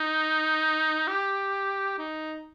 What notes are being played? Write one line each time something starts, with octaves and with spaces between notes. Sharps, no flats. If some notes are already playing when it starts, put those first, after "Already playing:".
Already playing: D#4
G4
D#4